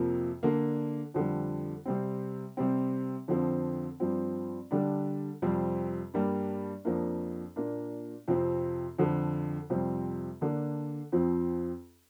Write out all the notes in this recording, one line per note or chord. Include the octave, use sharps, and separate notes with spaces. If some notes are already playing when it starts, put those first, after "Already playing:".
Already playing: F2 C3 F3 A#3
D3 A#3 D4
F2 D3 G3
C3 G3 C4
C3 G3 C4
F2 D3 F3 C4
G2 F3 C4
D3 G3 D4
F2 C3 G3 C4
G2 G3 A#3 D4
F2 F3 A#3 D4
A#2 A#3 D4
F2 C3 F3 C4
F2 D3 F3
F2 C3 G3 C4
D3 A#3 D4
F2 F3 C4